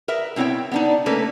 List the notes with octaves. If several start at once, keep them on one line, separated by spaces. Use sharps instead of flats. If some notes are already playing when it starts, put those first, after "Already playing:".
A#4 B4 E5
B2 C4 E4 C#5 G5
B3 D4 D#4
A3 A#3 C#4 A4 B4